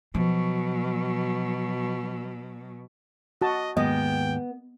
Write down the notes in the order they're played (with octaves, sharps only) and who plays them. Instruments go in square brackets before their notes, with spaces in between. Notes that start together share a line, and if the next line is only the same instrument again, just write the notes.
[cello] B2 F#3 [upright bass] F3
[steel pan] F#4 A5 [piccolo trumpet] D#5
[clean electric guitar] D#2 G#2 G#3 [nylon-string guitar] B3 [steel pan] D#5 [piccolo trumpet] G5